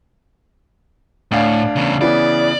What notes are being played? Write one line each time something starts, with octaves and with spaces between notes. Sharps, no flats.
D2 A2 D4 F5
E2 C#3
C#3 E3 B3 D5